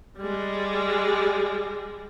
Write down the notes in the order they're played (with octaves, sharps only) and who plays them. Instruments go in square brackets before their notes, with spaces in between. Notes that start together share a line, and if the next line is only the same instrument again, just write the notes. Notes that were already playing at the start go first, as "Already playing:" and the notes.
[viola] G3 G#3